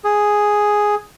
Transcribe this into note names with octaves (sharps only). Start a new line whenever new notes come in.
G#4